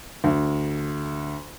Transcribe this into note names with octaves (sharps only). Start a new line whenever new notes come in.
D2